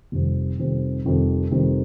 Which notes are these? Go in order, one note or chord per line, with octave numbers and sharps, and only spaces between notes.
F1 F2 D#3 G3 C4
F1 F2 D#3 G3 C4
F1 F2 D#3 G3 C4
F1 F2 D#3 G3 C4